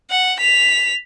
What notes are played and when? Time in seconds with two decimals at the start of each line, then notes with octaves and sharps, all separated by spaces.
0.10 F#5
0.40 B6 F7